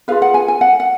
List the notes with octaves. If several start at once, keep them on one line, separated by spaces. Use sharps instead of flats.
F4 G#4 B4 F5
F#5
G#5
G#5
F#5
F#5